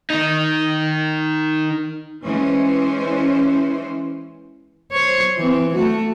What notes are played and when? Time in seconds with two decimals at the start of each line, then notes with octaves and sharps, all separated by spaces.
0.10 D#3 D#4
2.25 E3 G#3 C#4 C5
4.92 C5 C#5
5.38 E3 C4
5.76 A3 F#4